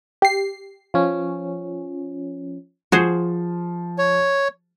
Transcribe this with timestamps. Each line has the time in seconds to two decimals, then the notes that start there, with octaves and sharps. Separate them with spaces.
0.22 G4 C7
0.94 F3 C#4
2.92 F3 F#4 G#4 C5
3.98 C#5